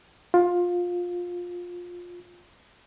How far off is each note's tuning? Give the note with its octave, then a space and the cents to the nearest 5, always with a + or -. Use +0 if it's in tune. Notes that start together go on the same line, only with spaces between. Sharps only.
F4 +15